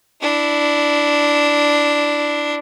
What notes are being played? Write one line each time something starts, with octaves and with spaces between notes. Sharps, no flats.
D4 E4